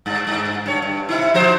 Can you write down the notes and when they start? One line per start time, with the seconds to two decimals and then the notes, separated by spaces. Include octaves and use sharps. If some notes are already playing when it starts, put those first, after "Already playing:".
0.06 G2
0.27 G2
0.66 G2 C#5
0.82 G2
1.09 C3 D#4 E4
1.34 F3 F#4 C5